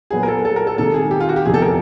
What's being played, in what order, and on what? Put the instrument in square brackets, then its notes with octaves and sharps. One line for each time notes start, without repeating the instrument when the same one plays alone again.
[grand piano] A#2 F#3 B3 [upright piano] G#4
[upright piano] A#4
A4
A4
A#4
A4
[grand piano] C3 D#3 G#3 [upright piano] A4
[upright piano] G#4
G4
F4
F#4
G4
[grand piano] F1 E2 C3 F3 [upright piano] G#4
[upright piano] A4
A#4